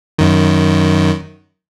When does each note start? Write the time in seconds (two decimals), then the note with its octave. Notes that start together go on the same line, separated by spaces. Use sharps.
0.19 F#2 D#3